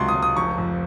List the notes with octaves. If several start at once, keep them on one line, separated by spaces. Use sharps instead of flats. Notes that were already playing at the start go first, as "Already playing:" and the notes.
Already playing: C#2 C3 F#3 C6 C#6
D#6
C#2
D#6
F1 C#6
F2